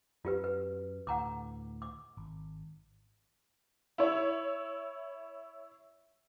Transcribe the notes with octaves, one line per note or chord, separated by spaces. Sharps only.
F#2 F4 G4 B4
B4
D2 A2 F#5 A#5 D6
D6
G#1
E4 C#5